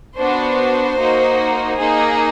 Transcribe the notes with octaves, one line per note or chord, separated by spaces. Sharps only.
B3 D4 F#4 C5
A#3 D#4 F#4
A#3 D#4 G#4